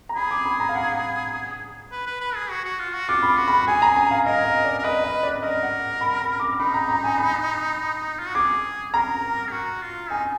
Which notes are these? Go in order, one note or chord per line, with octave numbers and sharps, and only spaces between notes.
A#5
G#4 B5
D6
B5
A#5
F5
F#5
B4
B4
B4
G#4
F#4
F#4
F4
F#4
F4 D6
B5
D6
F#4
B5
G#4 G#5
A#5
G#5
F5
A#4 D#5
D#5
D5
A#4
B4 D#5
D#5
D5
A#4 D#5
F#5
B5
B5
D6
D#4 B5
A#5
A#5
G#5
B5
F4
F#4
G#4 D6
A#4 A#5
G#4
F#4
F4
D#4 G#5